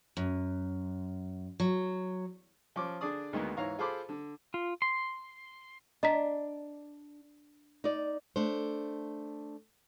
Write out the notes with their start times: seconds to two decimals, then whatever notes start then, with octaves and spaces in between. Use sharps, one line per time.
0.17 F#2
1.60 F#3
2.76 F3 C#4 D6
3.01 D3 D4 G#4 D5 D#6
3.33 D2 D#3 G#3 A#3 B3
3.57 G#2 E3 C#5 F5 A#5
3.79 F4 G#4 A4 C5 B5 D6
4.09 D3
4.54 F4
4.82 C6
6.03 D4 D#5 A#5 B6
7.84 D#4 D5
8.36 A3 D4 C5